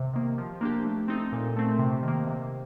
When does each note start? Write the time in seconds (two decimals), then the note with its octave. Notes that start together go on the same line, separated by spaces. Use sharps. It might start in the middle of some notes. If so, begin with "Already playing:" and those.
Already playing: C3
0.14 D#3 A#3
0.38 F3
0.61 A#3 D4 G4
0.85 A3
1.08 C4 D#4 A4
1.32 A#2
1.56 A3 C4
1.79 C3
2.03 D#3
2.08 A#3
2.27 C3